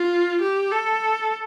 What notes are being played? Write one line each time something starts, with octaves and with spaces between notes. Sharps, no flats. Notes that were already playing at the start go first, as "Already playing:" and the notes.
Already playing: F4
G4
A4